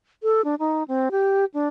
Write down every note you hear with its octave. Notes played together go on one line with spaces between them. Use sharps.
A4
D4
D#4
C4
G4
D4